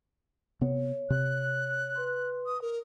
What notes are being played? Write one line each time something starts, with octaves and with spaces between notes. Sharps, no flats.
C3 B3 C#5
C3 F#6
B4 C6
D#6
A#4